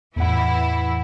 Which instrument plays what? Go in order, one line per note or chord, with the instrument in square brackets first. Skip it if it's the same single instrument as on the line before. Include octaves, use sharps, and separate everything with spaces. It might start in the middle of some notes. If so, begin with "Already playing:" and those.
[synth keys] E2 A2 F#5 [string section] E3 E4